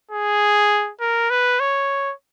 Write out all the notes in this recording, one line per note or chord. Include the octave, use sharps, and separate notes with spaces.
G#4
A#4
B4
C#5